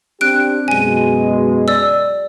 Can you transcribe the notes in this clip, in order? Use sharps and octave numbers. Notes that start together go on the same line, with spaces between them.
C4 D4 G4 F#6 D7
F#2 B2 G#3 G#5 D#7
D5 E6